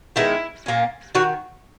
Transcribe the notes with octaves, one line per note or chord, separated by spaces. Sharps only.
D#3 G#3 B3 E4
A#2 A#3 C#4
D#3 F#4